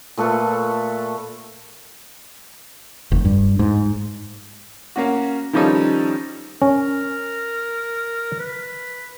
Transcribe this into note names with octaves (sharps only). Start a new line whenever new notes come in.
A#2 A3 A4 B4
F1
G2
G#2
A#3 C#4 F#4
D#3 F3 G3 C#4 D#4 A4
C#4 A#4
B4